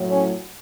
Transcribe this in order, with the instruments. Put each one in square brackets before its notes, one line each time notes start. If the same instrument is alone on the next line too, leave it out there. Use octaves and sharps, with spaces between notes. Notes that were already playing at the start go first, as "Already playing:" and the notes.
Already playing: [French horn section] A2 F#3
C#4